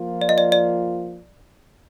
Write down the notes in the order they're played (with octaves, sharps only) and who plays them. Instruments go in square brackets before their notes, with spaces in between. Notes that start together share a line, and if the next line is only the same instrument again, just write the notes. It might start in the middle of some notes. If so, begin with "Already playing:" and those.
Already playing: [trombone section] F3 A#3 F4
[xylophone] D5
D#5
D5
D5